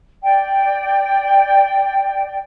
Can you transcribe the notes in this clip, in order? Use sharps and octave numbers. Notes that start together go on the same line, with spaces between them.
D5 G5